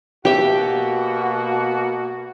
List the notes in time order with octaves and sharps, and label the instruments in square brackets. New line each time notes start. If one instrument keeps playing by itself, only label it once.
[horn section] B2 A#3 F#4 [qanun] G4 E5